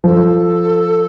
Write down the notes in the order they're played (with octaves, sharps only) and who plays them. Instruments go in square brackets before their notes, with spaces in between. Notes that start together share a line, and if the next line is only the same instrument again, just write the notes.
[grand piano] F3 [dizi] A4